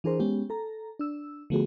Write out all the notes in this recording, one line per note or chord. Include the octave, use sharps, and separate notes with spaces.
E3 D4 G#4 A#4 C5
G#3 B3 C#4 G4
A4 A#5
D4 E6
D3 F3 A3 B3 F#4 G#4